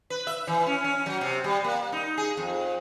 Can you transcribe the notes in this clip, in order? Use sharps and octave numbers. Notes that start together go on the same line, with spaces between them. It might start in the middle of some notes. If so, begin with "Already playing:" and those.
B4
E5
E3
C#4
C#4
F#3
C3
G3
A#3
D#4
G#4
F2